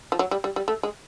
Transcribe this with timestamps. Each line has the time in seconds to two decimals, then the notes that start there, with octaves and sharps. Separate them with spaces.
0.12 F3
0.19 F#3
0.31 G3
0.44 G3
0.56 G3
0.68 A3
0.83 G#3